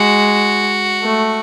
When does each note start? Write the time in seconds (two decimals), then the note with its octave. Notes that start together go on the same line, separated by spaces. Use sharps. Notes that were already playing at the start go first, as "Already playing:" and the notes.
Already playing: G#3 F#4
1.03 A3